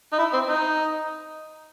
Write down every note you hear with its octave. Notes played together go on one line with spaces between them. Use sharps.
D#4
E4
C4
D#4